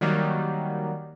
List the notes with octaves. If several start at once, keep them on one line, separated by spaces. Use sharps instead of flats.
D#3 F#3 G3 A#3